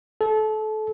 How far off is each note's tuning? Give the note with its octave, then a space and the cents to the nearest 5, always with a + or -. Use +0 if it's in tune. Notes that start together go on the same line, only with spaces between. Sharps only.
A4 -25